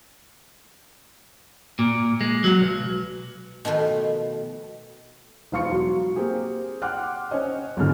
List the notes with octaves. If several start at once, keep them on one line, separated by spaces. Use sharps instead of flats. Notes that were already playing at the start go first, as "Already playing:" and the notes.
A#2
G#3
F#3
B1
B2 D#3 F3 A3 B4
E1 F3 F5 C6 C#6 C#7
F#3 F#4
A#3 C4 G4 G#4
F#5 G5 C6 D6 F6 F#6
C#4 C5 C#5 D#5
G#1 E2 G#2 D3 C#4 F6